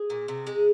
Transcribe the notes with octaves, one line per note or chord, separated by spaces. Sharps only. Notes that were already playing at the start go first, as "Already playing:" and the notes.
Already playing: G#4
A#2
C3
G#3